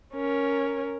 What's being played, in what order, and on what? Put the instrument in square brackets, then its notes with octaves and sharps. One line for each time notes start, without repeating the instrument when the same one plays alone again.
[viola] C#4 A#4